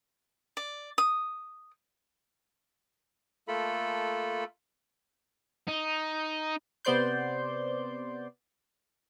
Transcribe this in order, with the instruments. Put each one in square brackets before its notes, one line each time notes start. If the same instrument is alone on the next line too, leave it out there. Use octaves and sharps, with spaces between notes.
[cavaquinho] D5
D#6
[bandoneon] A3 A#3 F4 A4 B5
[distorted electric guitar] D#4
[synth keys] C3 B3 C5 D5 C6 G6